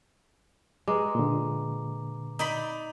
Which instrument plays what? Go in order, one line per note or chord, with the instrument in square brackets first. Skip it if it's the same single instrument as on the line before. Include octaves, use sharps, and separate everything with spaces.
[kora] G#3 [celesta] B4 A#5 D6
[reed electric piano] A#2 D3
[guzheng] D#4 D5 B5